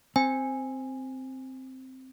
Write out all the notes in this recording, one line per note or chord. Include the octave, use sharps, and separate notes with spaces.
C4 G#5